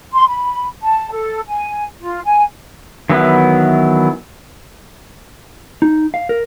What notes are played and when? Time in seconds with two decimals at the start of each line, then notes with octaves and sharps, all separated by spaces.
0.12 C6
0.27 B5
0.82 A5
1.10 A4
1.47 G#5
1.99 F4
2.25 G#5
3.10 D#3 E3 F#3 B3 E4
5.82 D#4
6.14 F5
6.29 A#4